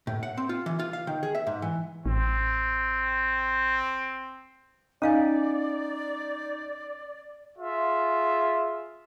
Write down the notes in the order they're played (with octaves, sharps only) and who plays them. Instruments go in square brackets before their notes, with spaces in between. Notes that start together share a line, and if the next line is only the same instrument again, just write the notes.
[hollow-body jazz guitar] A2
F#5
C4
F4
E3
F4
F5
D#3
G#4
E5
G#2
E3
[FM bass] A1 [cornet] C4
[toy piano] C#4 F5 G#5 [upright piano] D#4 [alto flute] D5
[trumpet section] F4 G#4 E5